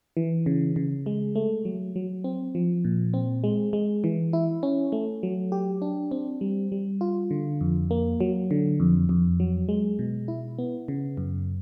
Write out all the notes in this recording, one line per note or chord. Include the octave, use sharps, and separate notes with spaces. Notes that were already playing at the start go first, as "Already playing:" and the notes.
E3
C#3
C#3
G#3
A3
F#3
F#3
C4
F3
A#2
C4
G#3
G#3
E3
E4
C#4
A3
F#3
G4
D4
C4
G3
G3
F4
D3
F2
A#3
F#3
D3
F2
F2
F#3
G#3
B2
E4
B3
C#3
F#2